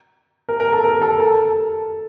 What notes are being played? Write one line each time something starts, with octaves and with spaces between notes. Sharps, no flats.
A#4
A#4
A4
A#4
A4
A4